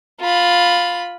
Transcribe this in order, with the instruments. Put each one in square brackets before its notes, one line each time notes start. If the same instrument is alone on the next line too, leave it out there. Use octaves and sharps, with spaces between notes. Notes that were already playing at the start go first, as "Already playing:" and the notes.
[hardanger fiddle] F4 B5